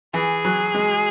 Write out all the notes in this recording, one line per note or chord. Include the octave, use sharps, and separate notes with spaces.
E3 G#4
F#3
G#3